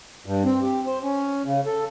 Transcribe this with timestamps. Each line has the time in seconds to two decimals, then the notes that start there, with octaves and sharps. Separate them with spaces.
0.26 G2
0.45 C4
0.62 G4
0.87 C5
1.03 C#4
1.46 C#3
1.66 A4